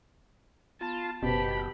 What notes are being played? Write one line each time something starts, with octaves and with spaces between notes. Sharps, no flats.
B3 F4 A5
F#1 B2 G4 B4 C5 A5 B5